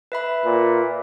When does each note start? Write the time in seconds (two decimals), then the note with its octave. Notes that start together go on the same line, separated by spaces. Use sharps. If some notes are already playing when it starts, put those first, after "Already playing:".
0.12 B4 E5 B5
0.44 A#2